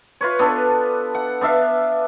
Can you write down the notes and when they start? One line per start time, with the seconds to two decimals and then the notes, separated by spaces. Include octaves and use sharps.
0.21 F4 B4 C#5
0.39 B3 D4 A4 B4
1.14 F#5
1.41 B3 D4 E5 F5